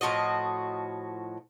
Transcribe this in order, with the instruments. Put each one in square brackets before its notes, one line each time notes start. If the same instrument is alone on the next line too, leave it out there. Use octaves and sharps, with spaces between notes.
[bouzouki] A2 F3 F#4 D#5